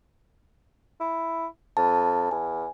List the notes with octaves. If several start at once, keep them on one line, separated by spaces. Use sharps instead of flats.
E4
F2 A5
E2 G#5